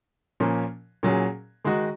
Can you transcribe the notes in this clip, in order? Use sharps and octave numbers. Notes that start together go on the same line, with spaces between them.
A#2 F3 A#3 C#4
A#2 F#3 C#4 G#4
D#3 G#3 D#4 F#4